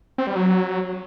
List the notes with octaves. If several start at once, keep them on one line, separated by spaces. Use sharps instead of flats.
C4
G3
F#3